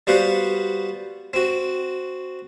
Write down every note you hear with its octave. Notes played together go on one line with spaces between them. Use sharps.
G3 B3 F#4 C5 F5 F#5
C4 F#4